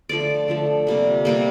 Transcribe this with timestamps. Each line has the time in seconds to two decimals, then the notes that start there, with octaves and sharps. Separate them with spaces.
0.09 D3 F3 A3 D5
0.48 D3 F3 A3
0.87 C3 G3 A#3
1.25 C3 G3 A#3